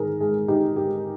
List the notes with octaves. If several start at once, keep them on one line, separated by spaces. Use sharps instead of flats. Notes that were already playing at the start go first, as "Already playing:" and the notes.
Already playing: G#2 D#3 G#4 A#4
G#3 G#4
D#4 G4
G#2 G4